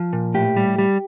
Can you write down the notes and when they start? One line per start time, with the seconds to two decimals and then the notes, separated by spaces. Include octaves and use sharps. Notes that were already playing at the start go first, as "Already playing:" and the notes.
Already playing: F3
0.13 A#2
0.35 A2 G4
0.57 G3
0.79 G3